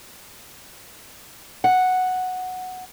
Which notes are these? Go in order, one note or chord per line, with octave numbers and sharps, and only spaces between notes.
F#5